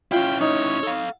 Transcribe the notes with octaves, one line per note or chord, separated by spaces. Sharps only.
C#4 E4 F4 F5 G5
D#4 C#5
A4 F5